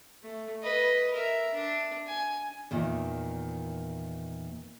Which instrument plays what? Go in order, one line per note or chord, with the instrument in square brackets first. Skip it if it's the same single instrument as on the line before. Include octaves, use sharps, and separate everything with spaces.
[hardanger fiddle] A3
B4 D#5
A#4 E5
D4
G#5
[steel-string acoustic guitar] E2 A#2 D#3